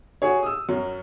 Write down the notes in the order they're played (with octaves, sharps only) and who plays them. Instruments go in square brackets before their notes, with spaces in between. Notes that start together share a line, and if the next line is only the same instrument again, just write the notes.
[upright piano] F#4 G#4 C#5
D#6 E6
F#2 F#3